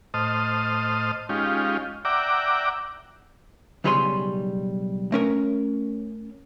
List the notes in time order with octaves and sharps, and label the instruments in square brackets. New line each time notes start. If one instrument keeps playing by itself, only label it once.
[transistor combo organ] A2 C5 D#5 A5 D#6 F6
G#3 C#4 D#4 F4 G4
D5 E5 F#5 G5 A#5 D6
[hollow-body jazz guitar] B1 C#3 G3 C#5 G#5 C6
A3 C#4 A#4